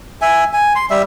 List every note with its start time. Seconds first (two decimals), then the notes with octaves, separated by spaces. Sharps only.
0.22 E5 G#5
0.53 G#5
0.75 C6
0.90 G3 E5